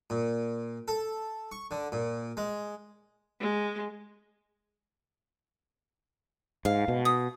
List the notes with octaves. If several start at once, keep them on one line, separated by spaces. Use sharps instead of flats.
A#2
A4
C#6
D3
A#2
G#3
G#3
G#2 F5
B2
D#6